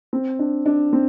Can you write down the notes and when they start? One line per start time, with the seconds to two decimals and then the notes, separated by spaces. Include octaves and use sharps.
0.13 C4
0.39 D4
0.66 D4
0.93 C4